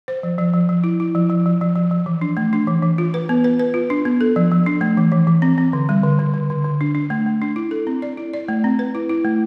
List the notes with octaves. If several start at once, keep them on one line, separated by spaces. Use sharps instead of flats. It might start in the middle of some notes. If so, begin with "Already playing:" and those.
C5
F3
F3
F3
F3
E4
E4
F3
F3
F3
F3
F3
F3
E3
D4
A3
D4
E3
E3
F4
B4
B3
B4
B4
F4
D4
B3
A4
F3
F3
D4
A3
E3
E3
E3
C4
C4
D3
G3
D3
D3
D3
D3
D3
D4
D4
A3
A3
D4
E4
A4
C4
D5
E4
D5
A3
C4
B4
E4
E4
A3